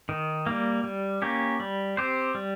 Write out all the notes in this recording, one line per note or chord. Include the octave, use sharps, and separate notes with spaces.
D#3
G3 A#3
G3
A#3 C#4 G4
G3
C4 G4 C5
G3